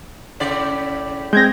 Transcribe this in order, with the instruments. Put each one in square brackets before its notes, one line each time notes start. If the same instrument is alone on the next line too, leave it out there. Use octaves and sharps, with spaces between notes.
[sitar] A2 C#3 D5
[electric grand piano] G#3 C4 [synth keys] G6 G#6 A#6